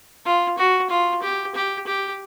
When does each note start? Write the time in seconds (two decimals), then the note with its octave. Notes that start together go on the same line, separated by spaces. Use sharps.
0.25 F4
0.58 F#4
0.90 F4
1.22 G4
1.55 G4
1.87 G4